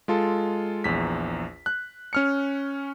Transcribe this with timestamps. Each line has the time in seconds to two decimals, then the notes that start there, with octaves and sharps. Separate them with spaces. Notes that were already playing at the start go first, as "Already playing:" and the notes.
0.08 G#3 F4 A4
0.84 A#1 E2 B6
1.66 F#6
2.13 C#4 F6 C#7